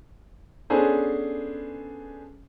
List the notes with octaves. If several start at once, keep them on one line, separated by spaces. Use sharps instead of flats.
B3 C#4 D4 G#4 A4 C5